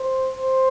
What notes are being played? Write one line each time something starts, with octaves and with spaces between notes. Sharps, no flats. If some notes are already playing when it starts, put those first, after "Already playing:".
Already playing: C5
C5